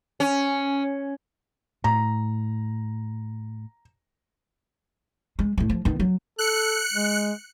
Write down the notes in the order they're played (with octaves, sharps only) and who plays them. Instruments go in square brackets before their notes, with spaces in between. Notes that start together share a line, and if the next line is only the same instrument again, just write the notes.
[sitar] C#4
[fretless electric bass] A2 [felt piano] A#5
[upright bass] G#3
A2 A3
F3
D#3 B3
F#3
[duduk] A4 [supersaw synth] F#6 C#7
[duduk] G#3